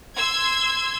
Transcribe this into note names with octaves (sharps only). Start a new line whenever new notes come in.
C6 E6 G#6